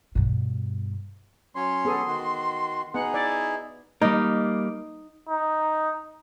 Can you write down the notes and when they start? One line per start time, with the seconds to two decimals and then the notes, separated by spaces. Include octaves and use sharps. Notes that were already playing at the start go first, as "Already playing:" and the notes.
0.15 G2 B2
1.56 F#3 C#4 C#5 C6
1.85 B3 G#4 A4
2.07 D#3 F#4
2.94 B3 D#4 G#4 F#5
3.14 E4 D5
4.02 G3 A#3 D#4
5.29 D#4